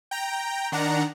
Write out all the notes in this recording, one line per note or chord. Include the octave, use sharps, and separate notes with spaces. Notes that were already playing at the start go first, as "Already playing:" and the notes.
G5 A#5
D#3 D4 F#5 A#5